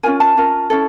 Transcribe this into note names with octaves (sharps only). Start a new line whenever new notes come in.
C#4 F4 A#4 G#5
A5
C#4 F4 A#4
C#4 E4 A4